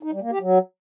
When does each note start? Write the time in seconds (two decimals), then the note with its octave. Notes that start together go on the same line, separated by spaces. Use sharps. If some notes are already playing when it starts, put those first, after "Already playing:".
0.03 D#4
0.12 G3
0.22 A#3
0.31 G4
0.41 F#3